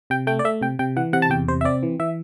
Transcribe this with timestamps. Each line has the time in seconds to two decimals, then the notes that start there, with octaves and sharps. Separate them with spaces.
0.10 C3 G5
0.27 A3 G5
0.39 D5
0.45 A3 E5
0.61 C3 G5
0.79 C3 G5
0.96 E3 F#5
1.13 C3 F#5
1.22 A5
1.30 E2 G5
1.48 C3 C5
1.61 E5
1.64 C4 D5
1.83 E3
1.99 E3 E5